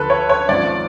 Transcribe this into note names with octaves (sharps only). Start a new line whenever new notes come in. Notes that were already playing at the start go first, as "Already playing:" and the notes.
Already playing: D2 D3 F3 A4 B4
C#5
C#5
G#1 G#2 F3 D5